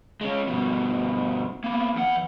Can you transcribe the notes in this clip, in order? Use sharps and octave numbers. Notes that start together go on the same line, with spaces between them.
G#3 C#4
G2 B2
A#3 B3
E2 F#5